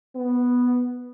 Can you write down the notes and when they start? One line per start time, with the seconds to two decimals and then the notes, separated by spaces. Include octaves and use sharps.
0.16 B3